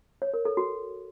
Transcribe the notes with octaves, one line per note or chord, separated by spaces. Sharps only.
C#5
A#4
A4
F#4